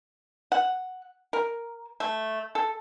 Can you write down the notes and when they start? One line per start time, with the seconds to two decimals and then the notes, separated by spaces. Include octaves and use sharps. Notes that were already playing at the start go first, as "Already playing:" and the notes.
0.52 F#5
1.33 A#4
2.00 A3
2.55 A4